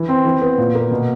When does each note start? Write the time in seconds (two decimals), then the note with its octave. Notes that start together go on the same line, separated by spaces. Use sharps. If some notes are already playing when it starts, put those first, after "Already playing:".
Already playing: E3
0.09 C4
0.25 E3
0.41 B3
0.58 A#2
0.75 A#3
0.91 B2